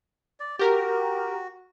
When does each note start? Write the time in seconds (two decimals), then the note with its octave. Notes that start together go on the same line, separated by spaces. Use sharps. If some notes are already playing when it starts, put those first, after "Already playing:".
0.40 D5
0.59 F#4 G4 A#4